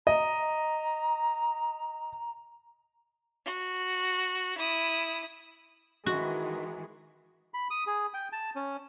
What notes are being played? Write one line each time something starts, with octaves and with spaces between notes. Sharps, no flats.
D#5 A#5
F#4
E4 D#6
D#3 E3 G#3 F#4
B5
D#6
G#4
G5
A5
C#4